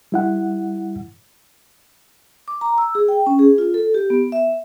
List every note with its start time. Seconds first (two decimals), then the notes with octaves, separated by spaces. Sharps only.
0.12 G3 E4 F#5
2.48 D6
2.61 A#5
2.78 E6
2.95 G#4
3.08 G5
3.27 C#4
3.39 G#4
3.58 F4
3.74 A4
3.94 G4
4.10 B3
4.32 E5